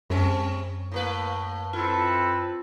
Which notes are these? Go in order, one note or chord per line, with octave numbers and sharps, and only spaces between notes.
F#2 G3 C4 C#4
A2 A#3 B4
C4 E4 F4 A4 B4